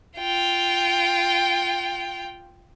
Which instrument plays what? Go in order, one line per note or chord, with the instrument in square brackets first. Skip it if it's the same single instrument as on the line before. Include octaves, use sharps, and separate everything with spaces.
[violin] F4 G5